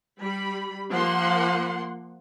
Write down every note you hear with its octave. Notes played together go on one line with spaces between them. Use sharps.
G3 B5
F3 A#3 F#5 C6